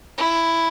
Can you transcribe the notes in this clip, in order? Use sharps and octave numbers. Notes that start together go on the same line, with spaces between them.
E4